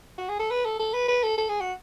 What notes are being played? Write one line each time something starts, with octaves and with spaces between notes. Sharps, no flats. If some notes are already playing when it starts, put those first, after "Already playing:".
F#4
G#4
A4
B4
A4
A4
B4
B4
A4
A4
G#4
F#4